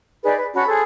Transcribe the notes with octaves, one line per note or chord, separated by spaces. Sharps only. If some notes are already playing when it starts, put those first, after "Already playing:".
D#4 G#4 B4 D5
B4
C#4 F#4 A5 B5
G#4 A4 C5